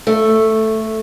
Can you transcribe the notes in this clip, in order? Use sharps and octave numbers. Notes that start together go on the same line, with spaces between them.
A3